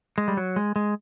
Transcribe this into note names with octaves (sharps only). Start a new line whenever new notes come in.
G#3
G3
F#3
G#3
G#3